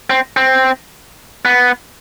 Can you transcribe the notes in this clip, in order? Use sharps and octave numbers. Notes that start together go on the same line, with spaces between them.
C4
C4
B3